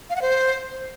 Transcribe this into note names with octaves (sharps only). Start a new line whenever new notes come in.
F5
F#5
C5